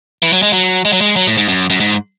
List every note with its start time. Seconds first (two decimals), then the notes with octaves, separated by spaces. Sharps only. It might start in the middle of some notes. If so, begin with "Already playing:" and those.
0.23 E3
0.33 F#3
0.42 G#3
0.53 F#3
0.85 G#3
0.93 F#3
1.01 G#3
1.16 F#3
1.27 A2
1.38 G#2
1.49 F#2
1.70 F#2
1.80 G#2